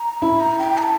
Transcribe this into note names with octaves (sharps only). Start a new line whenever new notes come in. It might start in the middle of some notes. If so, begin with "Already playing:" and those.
Already playing: A#5
E4 B5
A#5
G5
A#5
A5